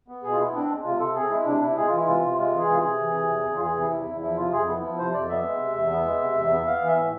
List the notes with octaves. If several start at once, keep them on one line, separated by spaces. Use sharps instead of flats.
B3
B2 G#4
F4
B3 E4
C4 D4
G#3
C3 F4
C3 A4
C4 G#4
G#3 E4
C3 D4
C3 E4
G#3 G#4
F4
E3 E4
C3 F4
C3
G#3 F4
E3 G#4
C3 F4
G#4
C3
E3
C3
E2
E2
F4
E3 G#4
C3
E4
E2
E2 E4
F3 E4
C3 F4
F2 G#4
B3 E4
F3 E4
C3 C5
F2 D5
B3 E5
G#3
C3
E2
B3
G#3
C3
E2
B3
B3 F5
E3
E5
A2